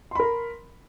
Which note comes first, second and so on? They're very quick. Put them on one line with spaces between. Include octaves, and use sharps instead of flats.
C6 B5 A#4